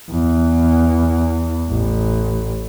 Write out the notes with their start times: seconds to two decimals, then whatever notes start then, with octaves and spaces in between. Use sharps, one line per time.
0.11 E2
1.70 A1